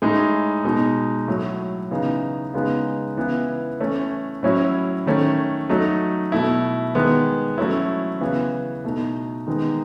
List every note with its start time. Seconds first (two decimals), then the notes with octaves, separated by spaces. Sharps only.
0.02 A2 G#3 D#4
0.64 B2 G#3 D#4
1.28 A2 F#3 A3
1.91 C#3 E3 B3 D#4
2.54 C#3 G#3 B3 D#4
3.17 C#3 E3 B3 E4
3.80 E3 A3 C#4
4.43 A2 F#3 C#4 E4
5.06 D#3 A3 C#4
5.69 F#3 A3 D#4
6.32 B2 A3 E4
6.95 D#3 G#3 B3
7.58 F#3 A3 C#4 E4
8.21 C#3 E3 B3
8.84 B2 A3 D#4
9.47 D#3 G#3 B3 D#4